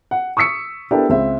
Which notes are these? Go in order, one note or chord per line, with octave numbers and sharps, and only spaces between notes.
F#5
C#6 D#6 E6 B6 C#7
B3 D4 E4 G4 A4 A#4
C#2 C4 E5